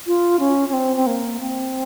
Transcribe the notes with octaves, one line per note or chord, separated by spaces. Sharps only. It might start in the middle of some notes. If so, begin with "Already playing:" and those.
F4
C#4
C#4
C4
C4
A#3
C4